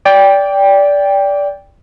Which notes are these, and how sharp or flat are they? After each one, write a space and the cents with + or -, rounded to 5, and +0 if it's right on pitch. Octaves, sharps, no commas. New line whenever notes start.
D5 -20 G5 +10